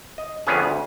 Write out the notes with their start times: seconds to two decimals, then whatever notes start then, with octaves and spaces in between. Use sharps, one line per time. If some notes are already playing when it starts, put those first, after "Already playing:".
0.18 D#5
0.47 F2 D3 B3 C#4 G#4
0.63 D2